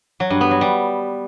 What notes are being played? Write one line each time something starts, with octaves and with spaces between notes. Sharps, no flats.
F#3
G2
B3
F#3
G3